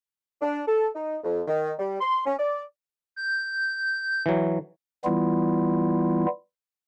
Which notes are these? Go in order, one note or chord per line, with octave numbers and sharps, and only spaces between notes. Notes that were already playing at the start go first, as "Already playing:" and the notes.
D4
A4
D#4
F2
D#3
G3
C6
C#4
D5
G6
E3 F#3
E3 G3 B3 E4 F4